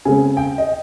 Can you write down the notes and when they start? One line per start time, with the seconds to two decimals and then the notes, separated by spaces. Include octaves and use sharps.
0.05 C#3 G#3 C4 G#5
0.37 G5
0.58 D#5